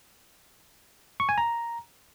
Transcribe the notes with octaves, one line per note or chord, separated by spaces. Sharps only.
C#6
G#5
A#5